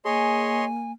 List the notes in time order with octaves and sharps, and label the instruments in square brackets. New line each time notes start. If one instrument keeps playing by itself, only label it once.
[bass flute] A#3 [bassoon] G#4 [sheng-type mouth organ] C#5 D#5 C6 [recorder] G#5